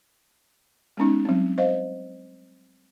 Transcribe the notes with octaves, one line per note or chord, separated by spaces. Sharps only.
G#3 B3 C#4 D#4
F#3 G3 C4
C5 D#5 F5